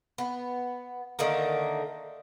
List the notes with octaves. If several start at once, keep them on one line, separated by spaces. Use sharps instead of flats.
B3
D3 D#3 A3 A#3